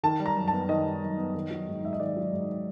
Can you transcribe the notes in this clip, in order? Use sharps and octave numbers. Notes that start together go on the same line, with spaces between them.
D#3 A5
G3
A#5
F#2
A5
B3
D#3 D#5
G3
F#2
B3
D#3
F#3
G#2
G#2 E5
D#5
D#3 D5
F#3
G#2